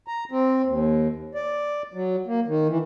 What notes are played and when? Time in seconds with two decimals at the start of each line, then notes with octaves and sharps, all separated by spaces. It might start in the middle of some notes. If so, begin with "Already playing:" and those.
0.08 A#5
0.31 C4
0.65 D#2
1.35 D5
1.94 F#3
2.26 A#3
2.47 D#3
2.68 E3